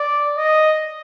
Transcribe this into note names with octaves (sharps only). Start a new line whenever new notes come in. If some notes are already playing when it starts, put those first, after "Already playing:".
Already playing: D5
D#5